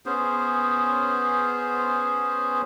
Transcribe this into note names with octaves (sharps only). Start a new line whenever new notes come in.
B3 C#4 G#4 C5